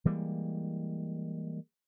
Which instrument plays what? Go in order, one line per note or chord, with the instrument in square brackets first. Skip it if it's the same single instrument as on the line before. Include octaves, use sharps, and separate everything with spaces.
[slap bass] E3 G3 G#3 A#3